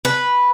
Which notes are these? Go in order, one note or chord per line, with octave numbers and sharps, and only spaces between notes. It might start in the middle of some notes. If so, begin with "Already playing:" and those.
B4